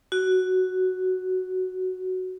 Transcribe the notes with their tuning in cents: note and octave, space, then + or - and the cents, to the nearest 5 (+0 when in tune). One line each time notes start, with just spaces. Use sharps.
F#4 +5